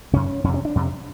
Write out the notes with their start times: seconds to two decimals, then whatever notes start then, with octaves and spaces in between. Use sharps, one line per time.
0.13 F#2 C#3 C#4
0.44 F2 C#4
0.48 C3
0.54 C#4
0.65 D4
0.75 F2 C3